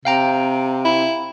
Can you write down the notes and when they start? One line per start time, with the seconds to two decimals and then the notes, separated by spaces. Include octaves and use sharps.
0.05 C3 F5 G5 A#5
0.85 E4